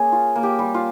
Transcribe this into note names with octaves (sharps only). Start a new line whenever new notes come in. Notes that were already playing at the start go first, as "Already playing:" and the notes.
Already playing: A#3 C#4 G#4
F4
A#3
G4
G3
F4